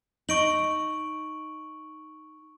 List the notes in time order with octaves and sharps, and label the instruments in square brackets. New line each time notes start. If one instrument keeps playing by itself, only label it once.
[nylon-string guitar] D#4 [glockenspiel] C#6 D7 F#7